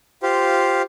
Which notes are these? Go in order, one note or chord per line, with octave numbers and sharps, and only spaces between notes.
F4 G4 C5 F5